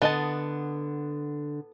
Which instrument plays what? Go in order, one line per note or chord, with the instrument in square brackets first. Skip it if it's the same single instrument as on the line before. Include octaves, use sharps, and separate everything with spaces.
[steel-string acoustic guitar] D3 [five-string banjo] B3 D#5 A5